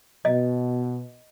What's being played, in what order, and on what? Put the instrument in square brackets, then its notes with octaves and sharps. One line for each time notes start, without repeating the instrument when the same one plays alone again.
[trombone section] B2 [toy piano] D#5